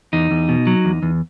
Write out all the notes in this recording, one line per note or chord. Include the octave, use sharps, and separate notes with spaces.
E2 D#4
E2
B2
F#3
E2
E2